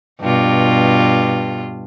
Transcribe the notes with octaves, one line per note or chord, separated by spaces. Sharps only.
G2 B2 F4